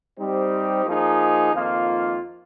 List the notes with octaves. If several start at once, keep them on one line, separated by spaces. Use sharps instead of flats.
G3 C4 D#4 G4 C5
F3 A#3 D#4 G#4
F2 D#3 A#3 F4